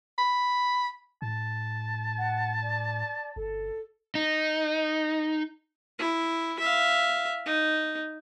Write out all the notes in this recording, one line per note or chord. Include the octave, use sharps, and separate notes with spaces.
B5
A2 A5
F#5
D5
G1 A4
D#4
E4
E5 F5
D#4